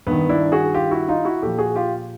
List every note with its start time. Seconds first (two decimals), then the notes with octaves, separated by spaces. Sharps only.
0.07 G2 D#3 B3
0.29 D4 E4
0.52 F#4 G#4
0.74 F4 G4
0.91 E4 F#4
1.08 D#4 F4
1.25 E4 F#4
1.42 A#2 F3 G4 A4
1.58 F#4 G#4
1.76 F4 G4